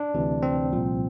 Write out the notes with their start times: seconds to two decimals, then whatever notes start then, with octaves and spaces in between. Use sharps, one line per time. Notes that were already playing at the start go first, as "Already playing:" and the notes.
Already playing: D4
0.14 D2 C3 E3
0.43 C4
0.73 C2 A#2 F3